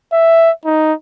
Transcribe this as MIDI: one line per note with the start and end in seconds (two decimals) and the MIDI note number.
0.12 0.51 76
0.65 0.93 63